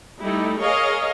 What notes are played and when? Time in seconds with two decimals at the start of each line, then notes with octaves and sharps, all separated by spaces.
0.22 G3 A3 D#4 E4
0.62 G#4 A#4 C#5 D#5 F5